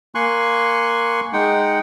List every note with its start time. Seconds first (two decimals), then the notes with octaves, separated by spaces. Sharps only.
0.15 A#3 G#5 C6 C#6 F#6
1.33 G#3 D#4 F#5 G5